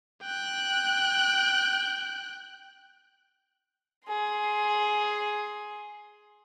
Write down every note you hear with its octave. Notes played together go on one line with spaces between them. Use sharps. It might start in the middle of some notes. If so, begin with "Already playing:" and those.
G5 F#6
G#4 C6